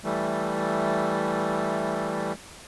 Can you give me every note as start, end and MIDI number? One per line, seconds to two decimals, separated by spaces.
0.04 2.33 52
0.04 2.33 55
0.04 2.33 57